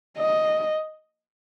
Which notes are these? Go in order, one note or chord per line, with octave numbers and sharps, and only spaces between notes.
D#5